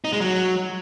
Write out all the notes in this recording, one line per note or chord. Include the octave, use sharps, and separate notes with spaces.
D#4
G#3
F#3